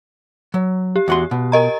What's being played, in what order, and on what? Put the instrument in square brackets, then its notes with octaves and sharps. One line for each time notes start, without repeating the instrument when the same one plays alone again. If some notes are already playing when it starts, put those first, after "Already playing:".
[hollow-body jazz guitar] F#3
[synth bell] G4
[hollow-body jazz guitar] E2 F#4 C6
B2
[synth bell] A#4 D#5 A#5